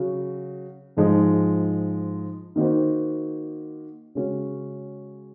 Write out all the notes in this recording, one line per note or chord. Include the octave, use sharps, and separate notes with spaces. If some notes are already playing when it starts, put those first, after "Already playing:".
Already playing: C#3 F#3 F#4
G#2 F3 G#3 D#4
D#3 A#3 D#4 F#4 C5
C#3 G#3 C#4 F#4